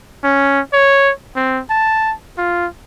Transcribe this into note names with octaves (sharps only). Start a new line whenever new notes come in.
C#4
C#5
C4
A5
F4